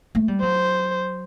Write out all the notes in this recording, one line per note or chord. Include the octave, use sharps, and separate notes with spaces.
A3
G3
F#3 C5